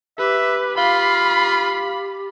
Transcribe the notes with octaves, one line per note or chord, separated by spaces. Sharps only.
G4 B4 E5
F4 F5 B5